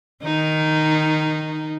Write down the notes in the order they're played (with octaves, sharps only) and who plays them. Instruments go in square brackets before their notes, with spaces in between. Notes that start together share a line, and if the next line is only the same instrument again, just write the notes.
[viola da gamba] D#3 D#4